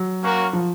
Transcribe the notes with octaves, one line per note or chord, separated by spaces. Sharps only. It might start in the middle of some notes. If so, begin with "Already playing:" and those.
Already playing: F#3
A#3 C#4 F#4 A#4
F3